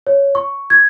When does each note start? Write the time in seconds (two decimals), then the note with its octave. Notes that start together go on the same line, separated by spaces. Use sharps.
0.07 C#5
0.35 C#6
0.70 G#6